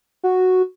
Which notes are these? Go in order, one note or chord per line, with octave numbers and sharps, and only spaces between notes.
F#4